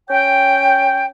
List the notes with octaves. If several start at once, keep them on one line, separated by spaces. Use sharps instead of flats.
C#4 C#5 G5